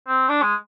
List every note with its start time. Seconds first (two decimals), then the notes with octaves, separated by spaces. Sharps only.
0.08 C4
0.29 D4
0.42 G#3